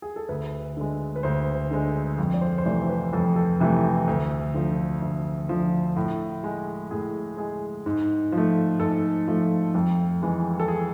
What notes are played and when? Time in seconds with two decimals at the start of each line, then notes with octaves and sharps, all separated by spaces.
0.02 G#4
0.16 A4
0.29 D2 B4
0.77 D3 G#3
1.16 B4
1.23 D2 C5
1.71 D3 G#3
2.18 F2
2.34 D5
2.41 C5
2.58 C5
2.65 C3 E3 A3 D5
2.82 A4
2.89 B4
3.13 F2 A4
3.24 B4
3.36 A4
3.60 C3 E3 A3
4.07 D2
4.54 D3 F3
5.02 D2
5.49 D3 F3
5.96 A2
6.44 G#3
6.91 A2 G#4
7.37 G#3 G#4
7.86 G#2
8.32 F3
8.38 A3
8.80 G#2 A4
9.27 F3 A3
9.74 F2 A4
10.22 E3 G#3
10.60 A4
10.68 G#4